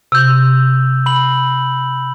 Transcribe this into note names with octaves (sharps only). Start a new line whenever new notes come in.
C3 E6 G6
B5 F#7